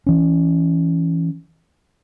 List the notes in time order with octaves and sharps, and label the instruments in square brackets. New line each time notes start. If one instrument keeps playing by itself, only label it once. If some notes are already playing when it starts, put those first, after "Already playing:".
[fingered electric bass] E3 C#4